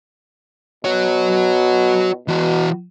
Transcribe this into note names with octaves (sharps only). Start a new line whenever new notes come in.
B2 F#4 C#5
B2 E3 F#4